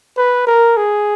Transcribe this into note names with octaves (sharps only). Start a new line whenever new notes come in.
B4
A#4
G#4